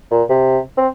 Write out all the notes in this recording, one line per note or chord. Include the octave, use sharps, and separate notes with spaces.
A#2
C3
C4